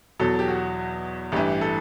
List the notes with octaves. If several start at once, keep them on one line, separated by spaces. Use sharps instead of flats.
E2 B2 F#3 A4
G4
F#4
A1 G2 E3 G4
A4